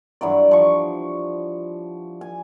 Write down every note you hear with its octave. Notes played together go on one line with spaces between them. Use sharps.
G2 E3 F#3 D5
F3 C#6
G#5